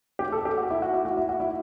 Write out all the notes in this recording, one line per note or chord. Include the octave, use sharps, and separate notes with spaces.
G4
A4
G4
F#4
E4
F#4
E4
F#4
E4
F#4
E4